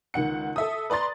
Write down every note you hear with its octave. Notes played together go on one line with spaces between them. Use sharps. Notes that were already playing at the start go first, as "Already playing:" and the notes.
C#2 D#3 F#5 C#7
A4 E5 D#6
B4 D5 A#5 C6 A6